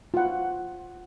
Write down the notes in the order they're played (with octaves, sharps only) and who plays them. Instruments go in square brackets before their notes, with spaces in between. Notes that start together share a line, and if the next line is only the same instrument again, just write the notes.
[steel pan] F4 F#5